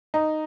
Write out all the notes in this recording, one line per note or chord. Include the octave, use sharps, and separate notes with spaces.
D#4